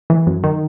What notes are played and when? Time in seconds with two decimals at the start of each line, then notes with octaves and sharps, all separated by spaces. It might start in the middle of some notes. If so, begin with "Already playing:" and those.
0.10 E3
0.27 F#2
0.44 D#3